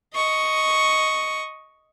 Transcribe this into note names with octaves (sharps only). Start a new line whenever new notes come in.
D#5 C#6